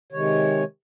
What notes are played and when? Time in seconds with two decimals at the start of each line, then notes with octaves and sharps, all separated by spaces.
0.12 C3 D#3 G#3 C#5